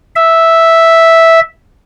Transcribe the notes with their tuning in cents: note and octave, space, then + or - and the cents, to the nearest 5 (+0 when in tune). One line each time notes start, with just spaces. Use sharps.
E5 -5